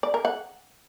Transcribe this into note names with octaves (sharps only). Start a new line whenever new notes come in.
D5
A#4
F#5